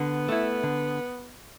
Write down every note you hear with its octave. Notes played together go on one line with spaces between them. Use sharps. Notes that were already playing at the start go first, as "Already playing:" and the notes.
Already playing: D3 B3
A3 E4
D3